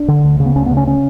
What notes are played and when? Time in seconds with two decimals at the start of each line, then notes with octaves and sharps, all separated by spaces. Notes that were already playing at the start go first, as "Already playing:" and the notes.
Already playing: D4
0.08 D3
0.24 D2
0.40 C#3
0.46 B3
0.56 D2 C#4
0.66 B3
0.71 C#3
0.77 C#4
0.87 C#4